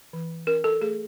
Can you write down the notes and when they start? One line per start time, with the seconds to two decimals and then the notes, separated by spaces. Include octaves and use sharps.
0.13 E3
0.47 C#4 A#4
0.64 A4
0.81 A3 G#4